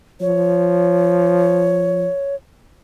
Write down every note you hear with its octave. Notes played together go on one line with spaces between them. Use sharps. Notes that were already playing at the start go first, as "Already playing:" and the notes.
F3 C#5